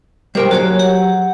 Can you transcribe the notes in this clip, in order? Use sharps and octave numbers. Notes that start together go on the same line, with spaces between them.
G3 A#4 C5 G5
F#3 F#4 G#4 C#5
G4 F#5